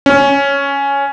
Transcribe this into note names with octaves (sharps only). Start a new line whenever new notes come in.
C#4